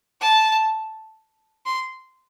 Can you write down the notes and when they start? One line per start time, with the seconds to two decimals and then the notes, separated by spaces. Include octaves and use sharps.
0.21 A5
1.66 C6